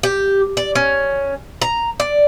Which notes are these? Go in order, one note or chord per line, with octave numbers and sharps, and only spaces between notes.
G4
D5
C#4
A#5
D5